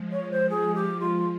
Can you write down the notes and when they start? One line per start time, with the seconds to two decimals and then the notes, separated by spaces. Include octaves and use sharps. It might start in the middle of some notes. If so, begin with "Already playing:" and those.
Already playing: F3 G#3
0.12 C#5
0.31 C5
0.49 G#4
0.74 G4
1.00 F4